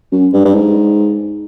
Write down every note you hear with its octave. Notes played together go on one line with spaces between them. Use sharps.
F#2
G2
G2
G#2